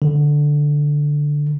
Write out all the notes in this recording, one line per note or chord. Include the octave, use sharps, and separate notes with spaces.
D3